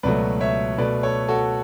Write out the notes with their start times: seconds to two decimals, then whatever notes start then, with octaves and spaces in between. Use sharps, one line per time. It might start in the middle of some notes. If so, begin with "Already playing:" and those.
0.03 C#2 B2 F#3 A3 B4 D5
0.41 C#5 E5
0.78 B2 A3 B4 D5
1.03 A4 C#5
1.28 F#4 A4